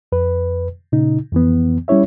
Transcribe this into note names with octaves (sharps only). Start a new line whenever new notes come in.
F2 B4
A#2 C#3 D#4
F2 E3 B3
G3 C#4 E4 C#5 E5